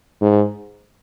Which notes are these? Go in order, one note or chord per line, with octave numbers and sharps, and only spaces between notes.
G#2